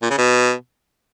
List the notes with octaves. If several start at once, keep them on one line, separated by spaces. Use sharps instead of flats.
A#2
C#3
B2